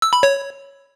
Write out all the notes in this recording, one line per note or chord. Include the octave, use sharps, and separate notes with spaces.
E6
B5
C#5